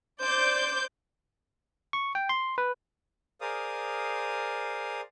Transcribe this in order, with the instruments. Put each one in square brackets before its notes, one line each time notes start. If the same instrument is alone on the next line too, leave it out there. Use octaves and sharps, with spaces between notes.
[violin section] C5 D5 D6 G6
[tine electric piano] C#6
G5
C6
B4
[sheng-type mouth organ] G#4 A#4 C5 D5 F5 D#6